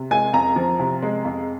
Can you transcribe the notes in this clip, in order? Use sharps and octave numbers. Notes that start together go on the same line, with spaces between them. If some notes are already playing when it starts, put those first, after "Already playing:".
Already playing: C3
G#3 G#5
F2 A#5
F3
C3
G#3
F2